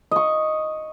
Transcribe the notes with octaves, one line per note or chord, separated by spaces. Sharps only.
D#5 C#6